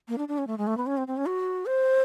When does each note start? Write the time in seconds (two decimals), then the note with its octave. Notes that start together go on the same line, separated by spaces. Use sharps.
0.08 A#3
0.18 D4
0.28 D4
0.38 C#4
0.47 A3
0.58 G#3
0.67 A3
0.77 B3
0.87 C#4
0.97 C4
1.07 C4
1.17 C#4
1.26 F#4
1.66 C5